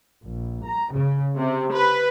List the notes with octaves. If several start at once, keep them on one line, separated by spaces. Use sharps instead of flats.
A#1
A#5
C#3
C3
B4